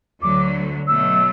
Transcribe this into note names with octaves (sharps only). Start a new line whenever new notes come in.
D2 D3 F#3 A3 D6
B2 F#3 A3 E6